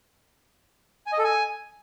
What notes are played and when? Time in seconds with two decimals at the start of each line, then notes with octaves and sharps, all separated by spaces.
1.06 G#5
1.12 D#5
1.18 A4
1.24 G#5